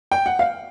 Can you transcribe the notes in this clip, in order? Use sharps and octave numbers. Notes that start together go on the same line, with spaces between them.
G5
F#5
F5